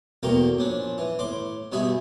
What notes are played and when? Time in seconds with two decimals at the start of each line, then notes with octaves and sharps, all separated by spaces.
0.23 E2 B2 A3 A#3 A#4 G5
0.58 A#1 C#4 D4
0.98 E3
1.19 A2 C6 D6
1.72 G2 B2 G3 G#4 E5 B5